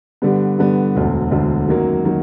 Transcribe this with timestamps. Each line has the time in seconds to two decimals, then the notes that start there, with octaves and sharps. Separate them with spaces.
0.22 G2 D3 G3 B3
0.59 G2 D3 G3 B3
0.95 E1 D2 D3
1.31 E1 D2 D3
1.69 F#2 D#3 F#3 A#3
2.05 D#3 F#3 A#3